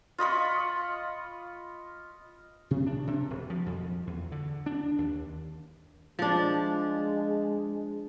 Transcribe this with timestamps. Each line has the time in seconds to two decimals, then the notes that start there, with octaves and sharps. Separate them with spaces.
0.18 F4 D#5 B5 C#6
2.71 C3
2.86 D4
3.07 C3
3.30 E1
3.50 F3
3.66 F2
4.07 E2
4.32 D3
4.66 D4
4.98 D#2
6.19 F3 G#3 D4